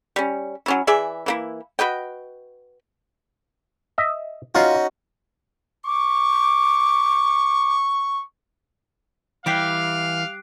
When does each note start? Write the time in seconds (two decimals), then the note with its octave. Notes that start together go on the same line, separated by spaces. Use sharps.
0.16 G3 C#4
0.66 F#3 C#4 E4
0.87 E3 G#4 D5 E5
1.26 E3 A#3 E4
1.79 F#4 B4 D#5 G5
3.98 D#5 E5
4.55 C#4 D#4 F4 F#4
5.86 C#6 D6
9.46 E3 G3 G4 F5 F#6 C7 D7